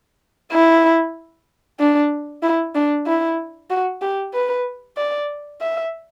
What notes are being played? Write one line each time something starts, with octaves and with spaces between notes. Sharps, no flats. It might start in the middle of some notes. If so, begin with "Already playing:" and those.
E4
D4
E4
D4
E4
F#4
G4
B4
D5
E5